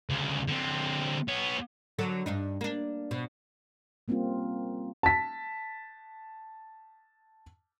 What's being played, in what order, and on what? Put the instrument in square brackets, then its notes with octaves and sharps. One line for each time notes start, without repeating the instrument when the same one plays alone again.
[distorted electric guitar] D2 C#3
D3 C4
B3 C#5
[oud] D3 F#3 A4
G2 D4 D#4
A#3 D4
B2
[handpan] G3 A#3 C4 C#4 F4
[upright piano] A5 B6